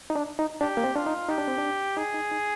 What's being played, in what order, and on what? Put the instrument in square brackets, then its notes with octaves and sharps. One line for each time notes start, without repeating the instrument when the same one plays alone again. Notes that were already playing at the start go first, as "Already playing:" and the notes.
[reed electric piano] D#4
D4
D#4
[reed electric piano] D4 [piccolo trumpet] G4
[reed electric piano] A#3
C4
[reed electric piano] D4 [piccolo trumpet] F4
[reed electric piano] D#4
[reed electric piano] D#4 [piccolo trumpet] G4
[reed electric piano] D4
C4
D4
[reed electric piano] D#4 [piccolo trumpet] G#4
[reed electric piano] D#4
D#4